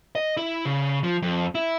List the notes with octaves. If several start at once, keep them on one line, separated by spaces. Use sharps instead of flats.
D#5
E4
C#3
F3
F2
E4